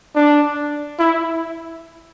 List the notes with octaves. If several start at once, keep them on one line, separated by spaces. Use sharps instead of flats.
D4
E4